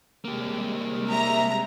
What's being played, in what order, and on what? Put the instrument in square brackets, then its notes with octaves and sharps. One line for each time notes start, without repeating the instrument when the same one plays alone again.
[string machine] C3 G3 G#3 [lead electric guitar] A#3 G4
[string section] E5 A#5